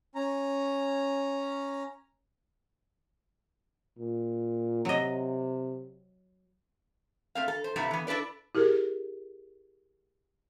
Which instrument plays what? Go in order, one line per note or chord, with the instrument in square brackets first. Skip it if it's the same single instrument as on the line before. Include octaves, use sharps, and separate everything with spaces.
[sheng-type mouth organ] C#4 A#5
[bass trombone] A#2
[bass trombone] C3 [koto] F#3 D#5
[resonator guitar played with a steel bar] A3 C4 F5
A4
C5
G2 C3 A3 B3 E4
E3 B3
D4 E4 A4 B4 D5
[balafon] E4 G4 G#4 A#4